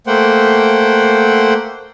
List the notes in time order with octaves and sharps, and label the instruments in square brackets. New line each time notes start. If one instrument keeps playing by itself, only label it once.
[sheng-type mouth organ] A3 A#3 C5 F#5 G5